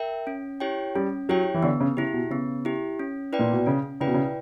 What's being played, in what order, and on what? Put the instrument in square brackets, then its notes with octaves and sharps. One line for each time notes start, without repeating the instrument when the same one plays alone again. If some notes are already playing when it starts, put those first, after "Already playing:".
Already playing: [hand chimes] A#4 E5 G5
C#4
E4 G4 C#5 G5
[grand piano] G3 [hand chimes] C#4
[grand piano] F#3 [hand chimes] E4 G4 C#5 G5
[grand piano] E3
[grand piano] D3 [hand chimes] B3
[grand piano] C#3
[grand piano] C#3 [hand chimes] E4 G4
[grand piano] B2
[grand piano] C#3 [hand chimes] B3
[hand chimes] E4 G4
C#4
E4 B4 D5 G5
[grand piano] A#2
B2
[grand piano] C#3 [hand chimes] C#4
[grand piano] C#3 [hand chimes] E4 B4 D5 G5
[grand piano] B2
C#3